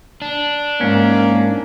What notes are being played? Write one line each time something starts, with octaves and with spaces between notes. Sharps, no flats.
D4
G#2 A#3 C#4